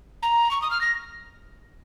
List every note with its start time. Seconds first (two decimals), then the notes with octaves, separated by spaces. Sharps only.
0.22 A#5
0.51 C#6
0.62 D#6
0.71 F6
0.81 A#6